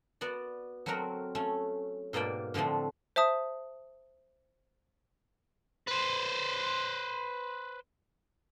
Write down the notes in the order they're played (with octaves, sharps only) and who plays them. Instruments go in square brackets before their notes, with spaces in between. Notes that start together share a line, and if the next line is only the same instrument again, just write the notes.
[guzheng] B3 F#4 D5
F#3 A3 C4 F#4 A#4
A3 C#4
G#2 B2 A#3 D5 G5
A2 D3 F3 A3 C4
[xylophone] C5 E5 A5 D#6
[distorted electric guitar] B4 C5